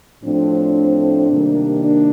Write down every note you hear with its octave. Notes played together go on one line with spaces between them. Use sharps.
A2 F3 A3 C4 D4
C3 D#3 G3 A#3
D4